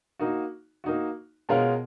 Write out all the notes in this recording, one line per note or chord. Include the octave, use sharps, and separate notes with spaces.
A#3 D#4 F#4
A#3 D#4 F#4
B2 G#3 C#4 F4 A#4